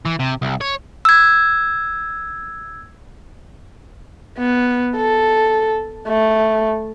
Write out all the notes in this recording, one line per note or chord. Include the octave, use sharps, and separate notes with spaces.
E3
C3
C2
C#5
E6 G#6
B3
A4
A3